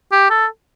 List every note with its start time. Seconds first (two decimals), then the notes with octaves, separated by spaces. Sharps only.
0.12 G4
0.30 A4